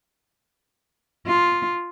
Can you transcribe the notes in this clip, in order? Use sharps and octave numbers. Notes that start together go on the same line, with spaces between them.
F4